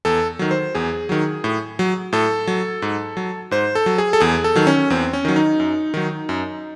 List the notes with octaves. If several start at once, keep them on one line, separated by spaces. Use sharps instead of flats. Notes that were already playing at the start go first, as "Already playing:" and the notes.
E2 A4
D#3 F#3
C5
E2 G#4
D#3 F#3
A2
F#3
A2 A4
F#3
G#2
F#3
G#2 C5
A4
F#3
G#4
A4
E2 G#4
A4
D#3 F#3
C#4
E2 C4
C#4
D#3 F#3
D#4
F#2
D#3 F#3
F#2